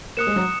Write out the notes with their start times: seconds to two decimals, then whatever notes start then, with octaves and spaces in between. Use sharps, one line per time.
0.17 A#3 D#6 F#6 C#7 E7
0.27 G#3
0.36 F#3